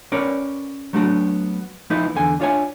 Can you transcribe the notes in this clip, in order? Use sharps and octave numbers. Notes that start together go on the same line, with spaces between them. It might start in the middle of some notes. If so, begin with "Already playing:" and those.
C#4 A#4 B4 C#5 D5
F#3 A3 B3 D4 F#4
F3 A#3 D#4 E4 B4 D#5
E2 D3 G#5
D4 F4 C#5 E5 G#5